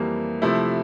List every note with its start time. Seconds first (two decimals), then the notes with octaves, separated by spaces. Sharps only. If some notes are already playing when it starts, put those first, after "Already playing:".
Already playing: F2 E3 G3 A#3
0.42 C3 F3 A3 E4